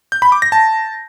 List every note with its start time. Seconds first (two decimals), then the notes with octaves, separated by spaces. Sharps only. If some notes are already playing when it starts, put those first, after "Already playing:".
0.12 G6
0.22 B5
0.32 D6
0.42 A#6
0.52 A5